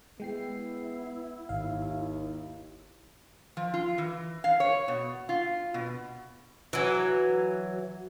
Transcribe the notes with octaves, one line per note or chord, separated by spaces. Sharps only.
G#3 B3 E4 G5 C7
G#1 D#2 F5
F3
F4
E3
F5
C#5
B2
F4
B2
E3 F#3